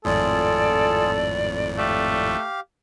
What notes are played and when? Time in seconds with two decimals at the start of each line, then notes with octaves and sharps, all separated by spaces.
0.05 G#1 F2 A2 F4 G#4 A4 D5
1.78 A3 G4 F5